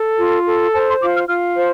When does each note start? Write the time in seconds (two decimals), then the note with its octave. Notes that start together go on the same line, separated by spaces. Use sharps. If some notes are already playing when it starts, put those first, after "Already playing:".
Already playing: A4
0.18 F4
0.46 A4
0.72 C5 A5
0.87 C6
1.00 F4 D6
1.14 F6
1.28 F4 F6
1.56 C5